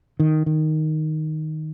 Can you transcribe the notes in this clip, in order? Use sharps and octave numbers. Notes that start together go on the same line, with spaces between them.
D#3
D#3